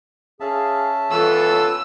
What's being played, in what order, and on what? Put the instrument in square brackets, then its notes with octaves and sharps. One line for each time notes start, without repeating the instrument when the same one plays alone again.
[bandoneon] C#4 E5 A5 [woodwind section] G#4 F5
[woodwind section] E3 B3 [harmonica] F4 A4 C#5 [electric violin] E6